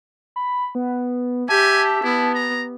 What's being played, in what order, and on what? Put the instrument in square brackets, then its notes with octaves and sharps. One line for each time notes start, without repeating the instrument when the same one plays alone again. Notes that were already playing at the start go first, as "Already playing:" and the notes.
[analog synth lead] B5
B3
[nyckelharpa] G4 E5 [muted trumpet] G#5 [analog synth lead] A5
[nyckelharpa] B3 [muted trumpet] E4
[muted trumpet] A#5